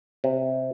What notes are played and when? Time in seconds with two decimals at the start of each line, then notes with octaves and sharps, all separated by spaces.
0.24 C3